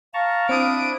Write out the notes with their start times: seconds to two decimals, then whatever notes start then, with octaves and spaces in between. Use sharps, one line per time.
0.14 F5 A5 A#5 C#6
0.49 C4 D4 E4 D#6 D7